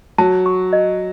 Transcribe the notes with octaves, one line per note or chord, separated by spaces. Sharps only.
F#3 A5
C#6
D#5